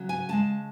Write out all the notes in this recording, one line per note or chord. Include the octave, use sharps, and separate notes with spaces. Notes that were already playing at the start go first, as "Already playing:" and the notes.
Already playing: C#3 F#3
G#5
D#2 C#3 G#3 A5